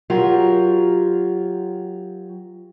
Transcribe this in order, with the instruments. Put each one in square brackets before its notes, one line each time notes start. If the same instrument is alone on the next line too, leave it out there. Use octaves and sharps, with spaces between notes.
[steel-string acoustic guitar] F#3 F4 G4 A#4